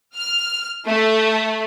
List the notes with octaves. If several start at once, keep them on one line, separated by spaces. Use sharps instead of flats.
F6
A3